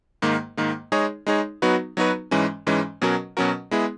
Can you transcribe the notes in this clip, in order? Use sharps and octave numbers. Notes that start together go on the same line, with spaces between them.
G#2 D#3 A#3
G#2 D#3 A#3
G#3 D#4 G#4 C#5
G#3 D#4 G#4 C#5
F#3 B3 D#4 F#4 B4
F#3 B3 D#4 F#4 B4
G#2 E3 G#3 C#4
G#2 E3 G#3 C#4
B2 F#3 C#4 F#4 A#4
B2 F#3 C#4 F#4 A#4
G#3 B3 E4 G#4